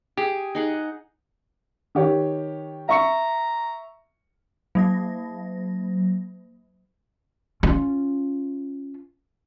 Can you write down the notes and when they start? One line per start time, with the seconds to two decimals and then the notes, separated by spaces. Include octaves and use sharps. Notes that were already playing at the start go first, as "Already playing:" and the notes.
0.17 G4 G#4
0.55 D#4 G#4 F#5
1.95 D#3 G4 C#5
2.89 E5 A#5 C#6 C#7
4.75 F#3 A#3 A#6
7.63 C#4 F4